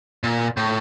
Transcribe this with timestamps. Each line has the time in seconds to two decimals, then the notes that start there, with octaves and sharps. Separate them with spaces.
0.24 A#2
0.57 A2